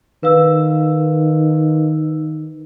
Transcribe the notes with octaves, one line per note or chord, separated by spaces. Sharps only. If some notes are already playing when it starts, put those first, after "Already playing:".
D#3 B4 F5 E6